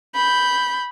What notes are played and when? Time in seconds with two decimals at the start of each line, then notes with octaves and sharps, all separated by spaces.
0.15 B5 G6